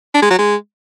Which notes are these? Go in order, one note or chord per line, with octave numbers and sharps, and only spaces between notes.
D4
G#3
F#3
G#3